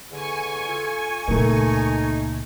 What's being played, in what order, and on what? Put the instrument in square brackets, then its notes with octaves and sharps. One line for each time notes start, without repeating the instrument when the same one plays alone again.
[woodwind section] E2 D3 [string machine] G#5 C#6
[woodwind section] F4 A4
[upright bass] C#2 A#2 [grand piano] A3 A#4 [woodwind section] D#4